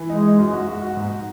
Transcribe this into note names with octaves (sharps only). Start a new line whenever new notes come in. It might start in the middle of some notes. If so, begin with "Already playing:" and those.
Already playing: E3
G#3 D#4
D#4
F#2
F#4
F#4
F#4
G#2